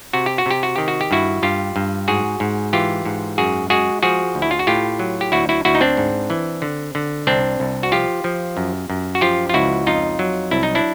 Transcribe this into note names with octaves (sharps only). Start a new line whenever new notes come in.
C3 F#4
G4
F#4
C3 G4
F#4
D#3 G4
F#4
G4
G2 E4 F#4
G2 F4 G4
G2
G#2 F#4 G#4
G#2
E3 F4 G4
G#2
F#2 F#4 G#4
G#3 F#4 G#4
F3 F#4 G#4
D2
E4
F4
F#4
A2 F4 G4
F#3
G4
D2 E4 F#4
E4 F#4
D2 E4 F#4
D#4
C4 D4
G#2
E3
D3
D3
C2 C4 D4
C2
F#4
F3 F4 G4
F3
F#2
F#2
F#4
F3 F4 G4
F4
C#2 E4 F#4
F2 D#4 F4
F#3
C2 E4
D#4
D4 E4